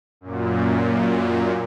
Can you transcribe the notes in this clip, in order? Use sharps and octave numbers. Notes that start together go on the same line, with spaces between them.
F#2 A#2